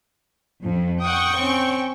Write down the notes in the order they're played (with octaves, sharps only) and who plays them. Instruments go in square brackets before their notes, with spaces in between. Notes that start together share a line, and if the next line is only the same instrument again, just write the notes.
[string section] F2
[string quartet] F#5 D#6 [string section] G5 C#6
[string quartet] C4 C#4